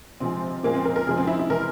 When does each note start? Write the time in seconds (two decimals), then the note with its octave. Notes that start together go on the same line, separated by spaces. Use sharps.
0.20 C3 F3 G#3 C4
0.63 A#2 F3 G#3 A#3
0.75 C4
0.85 A#4
0.96 A#4
1.07 C3 F3 G#3 G#4
1.17 C4
1.27 E4
1.39 E4
1.49 C3 E3 G#3 A#4